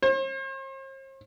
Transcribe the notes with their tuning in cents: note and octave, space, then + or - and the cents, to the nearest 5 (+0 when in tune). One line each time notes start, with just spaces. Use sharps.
C5 +45